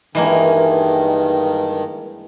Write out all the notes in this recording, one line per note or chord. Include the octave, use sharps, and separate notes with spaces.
G2 D#3 E3 G#3 A#3